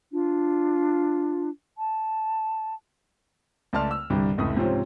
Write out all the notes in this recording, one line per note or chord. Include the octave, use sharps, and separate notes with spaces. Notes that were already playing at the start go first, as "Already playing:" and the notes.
D4 F4
A5
C#2 A3 D5 A5 C6 F6
E6
C2 G2 D3 G3
F1 C#2 A2 A3 D#6
G#2 C3 F3 C4 C#4 F4